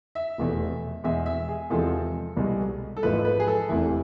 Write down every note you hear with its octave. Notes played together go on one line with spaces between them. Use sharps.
E5
F1 E2 B2 A3
E2 B2 G#3 E5
E5
G#4
E2 C3 F3 G#3 A4
C2 B2 G#3
A4
A1 G#2 F3 A3 B4
B4
G#4
A4
F1 E2 C3 E3 E4